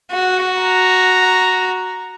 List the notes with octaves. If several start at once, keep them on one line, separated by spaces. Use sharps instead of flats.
F#4
A#5